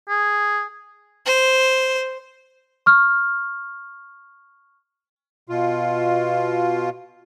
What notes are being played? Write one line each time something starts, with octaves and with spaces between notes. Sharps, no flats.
G#4
C5
C#6 F6
B2 F4